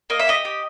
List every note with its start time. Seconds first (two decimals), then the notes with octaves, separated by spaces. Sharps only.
0.10 A#3 D#5
0.19 E5
0.27 G4 D#5
0.45 G4